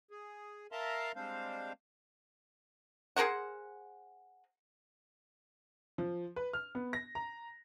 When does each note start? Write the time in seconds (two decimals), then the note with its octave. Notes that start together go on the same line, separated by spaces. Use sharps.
0.11 G#4
0.72 A#4 E5 F5 A5 A#5 C6
1.16 G3 G#3 C4 D4 C5 F5
3.16 G#4 A#4 C5 F#5
5.98 F3
6.36 B4
6.53 F6
6.75 B3
6.93 A#6
7.15 A#5